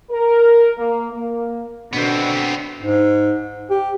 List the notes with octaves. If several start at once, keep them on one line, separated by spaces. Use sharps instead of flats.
A#4
A#3
A#3
B2 D3 B3 C4
G#2
G4